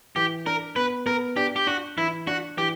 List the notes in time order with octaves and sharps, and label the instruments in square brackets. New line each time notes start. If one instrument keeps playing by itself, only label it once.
[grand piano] E3 [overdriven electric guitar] G4
[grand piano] D4 [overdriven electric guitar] A#4
[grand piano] B3 [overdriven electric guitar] B4
[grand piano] B3 [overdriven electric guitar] A#4
[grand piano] D4 [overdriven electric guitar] G4
[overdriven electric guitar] G4
[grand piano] D4 [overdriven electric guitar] F#4
[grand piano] E3 [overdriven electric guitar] E4
[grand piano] D4 [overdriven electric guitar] F#4
[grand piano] E3 [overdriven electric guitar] G4